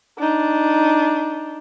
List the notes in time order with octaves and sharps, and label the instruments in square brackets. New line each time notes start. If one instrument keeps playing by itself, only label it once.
[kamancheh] D4 D#4